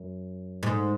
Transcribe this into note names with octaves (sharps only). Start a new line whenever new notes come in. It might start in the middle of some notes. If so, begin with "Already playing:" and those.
Already playing: F#2
G#2